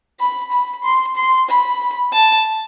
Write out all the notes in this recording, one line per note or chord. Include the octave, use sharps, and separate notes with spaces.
B5
B5
C6
C6
B5
A5